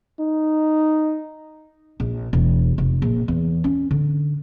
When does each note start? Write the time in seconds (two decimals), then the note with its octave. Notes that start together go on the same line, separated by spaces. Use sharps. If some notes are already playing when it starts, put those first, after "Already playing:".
0.20 D#4
2.00 A#1
2.33 E1
2.78 F1
3.02 A#1
3.28 E2
3.64 C#4
3.91 D3